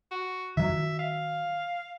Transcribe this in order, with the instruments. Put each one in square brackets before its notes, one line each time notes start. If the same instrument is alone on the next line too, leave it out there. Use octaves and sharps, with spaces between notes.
[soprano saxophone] F#4
[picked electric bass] D#3 F#3 [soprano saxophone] E5
[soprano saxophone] F5